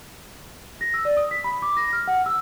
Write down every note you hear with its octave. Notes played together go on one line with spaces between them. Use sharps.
A#6
E6
D5
D#6
B6
B5
D6
A#6
F6
F#5
E6